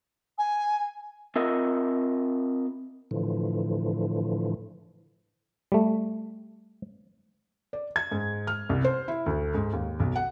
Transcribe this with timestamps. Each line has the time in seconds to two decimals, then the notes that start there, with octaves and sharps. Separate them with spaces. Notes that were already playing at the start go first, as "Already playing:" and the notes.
0.38 G#5
1.36 C4 F4 A#4 D#5 E5
3.11 A2 D3 E3 F3
5.72 G3 A3
7.73 D5
7.96 G#6
8.12 G#2
8.47 F6
8.69 C2
8.84 C5
9.08 E4
9.26 D2
9.55 G#2
9.73 D#2
10.00 B1
10.16 F#5